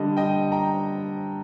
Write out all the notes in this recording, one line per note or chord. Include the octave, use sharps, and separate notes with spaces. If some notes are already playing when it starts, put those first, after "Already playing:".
Already playing: D3 G3 D#5
D#5 G5
G5 A#5